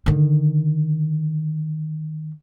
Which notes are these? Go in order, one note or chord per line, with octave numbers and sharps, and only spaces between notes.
D3 D#3